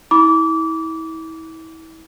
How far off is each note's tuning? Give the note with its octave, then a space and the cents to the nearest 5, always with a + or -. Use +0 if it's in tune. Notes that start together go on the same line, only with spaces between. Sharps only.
E4 -35 B5 -25 D6 -25